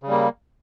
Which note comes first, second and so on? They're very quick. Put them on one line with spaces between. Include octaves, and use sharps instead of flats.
C#3 G3 A#3